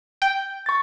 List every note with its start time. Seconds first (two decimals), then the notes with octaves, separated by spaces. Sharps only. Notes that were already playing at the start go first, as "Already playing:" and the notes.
0.22 G5 G6
0.66 C#6 A6